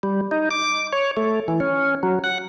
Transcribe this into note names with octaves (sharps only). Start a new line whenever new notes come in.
G3
D#4
D6
C#5
A3
E3
C#4
F#3
F#5